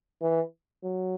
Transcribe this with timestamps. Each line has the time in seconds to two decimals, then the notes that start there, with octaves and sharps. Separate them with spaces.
0.22 E3
0.84 F#3